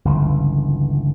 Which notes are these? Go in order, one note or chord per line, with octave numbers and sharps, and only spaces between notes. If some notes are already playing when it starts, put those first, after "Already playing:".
G1 C#2 E3